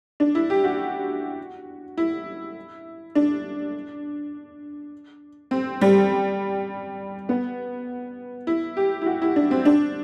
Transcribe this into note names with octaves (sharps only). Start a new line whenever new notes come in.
D4
E4
G4
F#4
E4
D4
C4
G3
B3
E4
G4
E4
F#4
E4
D4
C4
D4